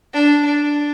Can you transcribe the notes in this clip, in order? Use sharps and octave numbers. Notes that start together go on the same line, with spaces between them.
D4
D4